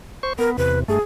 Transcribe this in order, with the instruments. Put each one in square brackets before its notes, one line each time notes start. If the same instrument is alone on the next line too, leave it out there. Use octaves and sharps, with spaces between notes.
[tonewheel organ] C5 C#6
[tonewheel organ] B3 [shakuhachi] A#4
[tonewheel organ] E2 C3 [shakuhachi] B4
[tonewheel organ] G2 A3 [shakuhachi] G#4